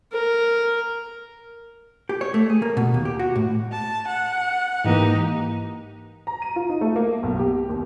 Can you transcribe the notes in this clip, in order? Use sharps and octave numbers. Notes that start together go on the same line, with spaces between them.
A#4
G4
C#5
A3
G#4
A#3
B2
D#2
G4
F#4
A2
A5
F#5
G#2 E3 A#3 D#4 G4
A#5
D#7
F4
D#4
A3
A#3
B1
G4
D#2